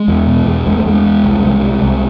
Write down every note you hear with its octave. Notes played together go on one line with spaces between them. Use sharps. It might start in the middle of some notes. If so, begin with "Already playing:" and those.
Already playing: G#3
E2
B2
E2
E2 G#3
A3
E2 G#3
E2
C2
C2
C3
C2